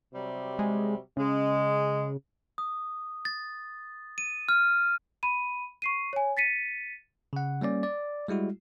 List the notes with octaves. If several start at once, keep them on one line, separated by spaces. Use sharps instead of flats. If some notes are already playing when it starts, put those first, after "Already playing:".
C3 F#3 G3
G#3
C#3 G#3
D#6
A6
D#7
F6
B5 D#7
C#6 C7 D#7
C#5 G#5
A6 B6 C#7 D#7
C#3 F#5
G3 A#3 C#4 D5
D5
G3 G#3 E4 F#4